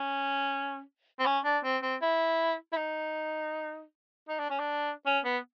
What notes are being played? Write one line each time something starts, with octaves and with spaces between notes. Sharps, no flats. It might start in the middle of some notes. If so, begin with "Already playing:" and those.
Already playing: C#4
C4
C#4
D4
C4
C4
E4
E4
D#4
D#4
D4
C#4
D4
C#4
B3